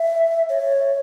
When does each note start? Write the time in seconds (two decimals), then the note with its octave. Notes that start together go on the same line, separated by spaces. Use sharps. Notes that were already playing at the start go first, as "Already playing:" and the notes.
Already playing: E5
0.49 C#5